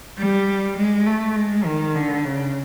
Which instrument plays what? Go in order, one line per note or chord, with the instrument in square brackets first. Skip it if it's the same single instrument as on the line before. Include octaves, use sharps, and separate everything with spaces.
[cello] G3
G#3
A3
G#3
D#3
D3
C#3